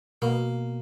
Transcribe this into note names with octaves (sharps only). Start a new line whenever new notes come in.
B2 A#3